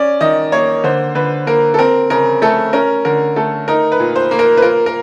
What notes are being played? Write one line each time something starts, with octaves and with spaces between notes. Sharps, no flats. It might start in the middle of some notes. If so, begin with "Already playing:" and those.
Already playing: C#4 D5
D#3 D#5
A#3 C#5
D3 C5
D3 B4
A#3 A#4
A4
C4 A#4
C#3 A#4
A3 A4
C#4 A#4
D3 A#4
A3 A4
D#4 A#4
B4
A#2
C5
A#3
A#4
B4
F4 A#4
A#4